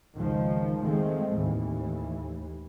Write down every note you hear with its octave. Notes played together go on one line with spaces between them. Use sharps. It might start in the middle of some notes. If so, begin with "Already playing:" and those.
C#2 D#3 F3
D#3 F3 G#3 A3 C4
D#2 A2 E3